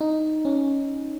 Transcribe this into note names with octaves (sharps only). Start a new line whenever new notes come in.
D#4
C#4